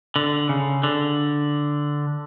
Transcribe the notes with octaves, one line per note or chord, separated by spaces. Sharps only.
D3
C#3
D3